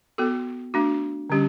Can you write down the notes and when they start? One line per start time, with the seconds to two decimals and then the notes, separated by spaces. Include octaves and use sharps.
0.18 B3 F#4 A4
0.74 A3 D4 F#4
1.30 D3 G3 C#4 G4